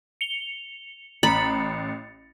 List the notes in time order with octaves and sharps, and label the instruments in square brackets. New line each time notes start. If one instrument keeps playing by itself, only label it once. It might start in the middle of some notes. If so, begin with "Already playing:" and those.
[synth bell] C#7 F7 G7
[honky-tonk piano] A1 [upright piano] A#5 [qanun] B5 [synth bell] A6 C#7